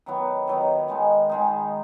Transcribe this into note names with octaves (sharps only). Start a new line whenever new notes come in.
D#3 F#3 B3 D#4
D#3 F#3 B3 D#4
D#3 G#3 D#4
D#3 G#3 D#4